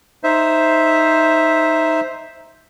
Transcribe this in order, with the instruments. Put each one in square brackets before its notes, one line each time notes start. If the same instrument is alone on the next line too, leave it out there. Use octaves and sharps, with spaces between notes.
[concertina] D#4 C5 E5